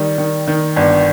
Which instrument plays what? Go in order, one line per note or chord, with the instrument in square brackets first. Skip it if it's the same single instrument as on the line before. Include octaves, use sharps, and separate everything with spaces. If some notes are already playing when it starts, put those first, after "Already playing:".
Already playing: [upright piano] D#3 G3 [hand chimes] D5
[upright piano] D#3
D#3
[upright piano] G1 [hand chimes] D5